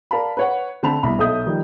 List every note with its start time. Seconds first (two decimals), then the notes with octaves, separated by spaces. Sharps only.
0.11 A#4 D5 F5 A5 B5
0.37 B4 C#5 F#5
0.83 D3 C4 A5 B5 F7
1.03 C2 B2 B5
1.19 B1 A4 E5 D#6 G6
1.46 D#3 F3 G3